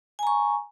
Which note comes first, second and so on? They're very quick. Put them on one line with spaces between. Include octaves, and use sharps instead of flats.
G#5 A#5 C#6